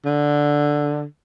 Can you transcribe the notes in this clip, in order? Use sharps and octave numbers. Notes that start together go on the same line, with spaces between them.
D3